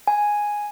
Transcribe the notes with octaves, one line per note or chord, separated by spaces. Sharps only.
G#5